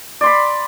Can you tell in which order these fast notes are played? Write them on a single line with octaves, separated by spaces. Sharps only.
D5 C6 B5